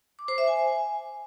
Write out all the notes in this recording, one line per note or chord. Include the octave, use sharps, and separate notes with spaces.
D6
C5
E5
G#5